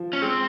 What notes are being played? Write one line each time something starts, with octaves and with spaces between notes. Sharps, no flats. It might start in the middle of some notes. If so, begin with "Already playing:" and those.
Already playing: F3
C#4
G#3 C4